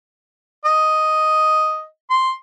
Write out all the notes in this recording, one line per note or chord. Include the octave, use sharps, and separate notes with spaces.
D#5
C6